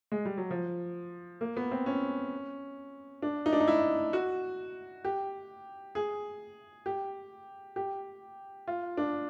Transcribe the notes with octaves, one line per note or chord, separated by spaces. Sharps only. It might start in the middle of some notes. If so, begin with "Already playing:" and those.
G#3
G3
F#3
F3
A#3
B3
C4
C#4
D4
D#4
D4
D#4
E4
F#4
G4
G#4
G4
G4
F4
D4